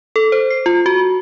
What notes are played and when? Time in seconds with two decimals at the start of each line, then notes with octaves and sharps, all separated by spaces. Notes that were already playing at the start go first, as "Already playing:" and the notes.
0.16 A4
0.32 C5
0.50 C7
0.66 F4
0.86 F#4